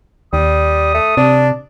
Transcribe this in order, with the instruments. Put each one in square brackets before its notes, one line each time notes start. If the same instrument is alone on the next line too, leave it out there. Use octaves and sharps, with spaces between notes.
[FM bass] D#2 [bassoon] G3 [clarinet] D#6
[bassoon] A3
[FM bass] C3 [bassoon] D4